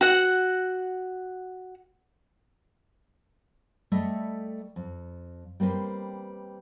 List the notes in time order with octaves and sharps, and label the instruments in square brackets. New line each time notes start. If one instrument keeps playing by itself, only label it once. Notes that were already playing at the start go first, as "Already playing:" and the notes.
[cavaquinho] F#4 F#5
[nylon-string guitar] G3 A3 A4 D#5 E5
F2
G3 A#3 C4 B4